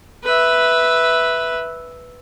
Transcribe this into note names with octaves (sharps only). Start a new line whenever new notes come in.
B4 E5